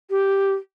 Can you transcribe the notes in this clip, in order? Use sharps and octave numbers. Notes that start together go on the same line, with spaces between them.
G4